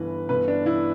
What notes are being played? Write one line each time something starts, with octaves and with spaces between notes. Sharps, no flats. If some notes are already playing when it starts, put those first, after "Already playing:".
Already playing: G1 E3 B4
G1 B4
D4
E3 E4